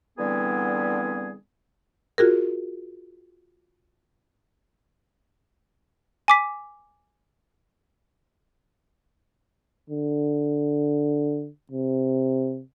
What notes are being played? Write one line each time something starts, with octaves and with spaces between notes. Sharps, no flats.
D3 E3 G3 B3 C4 G#4
F4 F#4 G#4 A#4
G#5 D6 B6
D3
C3